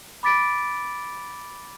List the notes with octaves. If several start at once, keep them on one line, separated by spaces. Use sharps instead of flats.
B5 D6 A6 B6 D7